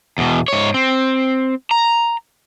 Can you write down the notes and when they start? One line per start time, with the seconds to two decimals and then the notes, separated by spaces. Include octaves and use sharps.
0.18 E2 B2
0.48 G#2 C#5
0.74 C4
1.71 A#5